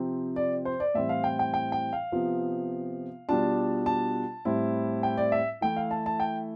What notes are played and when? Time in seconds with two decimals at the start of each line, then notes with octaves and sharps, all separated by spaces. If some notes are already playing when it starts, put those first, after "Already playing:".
Already playing: C3 F3 C4
0.36 D5
0.65 C5
0.80 D5
0.94 A2 E3 G3 C4 E4 E5
1.09 F5
1.24 G5
1.39 G5
1.54 G5
1.72 G5
1.93 F5
2.12 C3 F3 B3 F4
3.29 B2 G3 D4 F4 A5
3.86 A5
4.45 A2 G3 C4 E4
5.03 G5
5.17 D5
5.32 E5
5.61 E3 A3 E4 G5
5.76 F5
5.91 A5
6.06 A5
6.20 G5